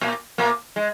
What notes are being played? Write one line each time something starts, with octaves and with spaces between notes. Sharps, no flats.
A#2 A#3
A#2 A#3
G#3